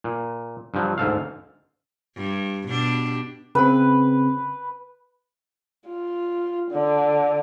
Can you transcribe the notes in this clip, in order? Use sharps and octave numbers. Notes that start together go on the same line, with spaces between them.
A#2
G2 F3 F#3
D2 G#2 A4 F5
G2
B2 D4 G4
C#3 C4 B4
F4
D3